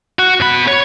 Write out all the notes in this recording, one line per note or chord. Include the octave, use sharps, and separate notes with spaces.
F#4 F#5
B2 B5
C#5